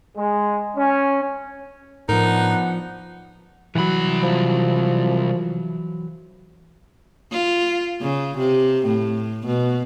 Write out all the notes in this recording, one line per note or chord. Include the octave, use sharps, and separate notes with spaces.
G#3
C#4
A2 F3 B3 D4 D#4 A#4 F#5
C2 E3 F#3 B5
F3
F4
C#3
C3
A2
B2